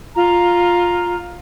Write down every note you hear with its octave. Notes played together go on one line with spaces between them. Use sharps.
F4 A#5